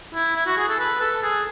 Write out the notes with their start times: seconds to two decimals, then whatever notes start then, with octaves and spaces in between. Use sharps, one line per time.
0.14 E4
0.36 E4
0.47 F#4
0.58 G#4
0.68 A4
0.79 B4
1.01 A4
1.23 G#4